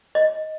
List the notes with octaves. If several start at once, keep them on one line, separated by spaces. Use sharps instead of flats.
D#5